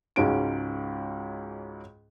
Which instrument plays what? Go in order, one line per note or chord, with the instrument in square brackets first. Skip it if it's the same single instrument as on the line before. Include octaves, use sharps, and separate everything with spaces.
[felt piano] C#2 G#2 C#4 F#4 D7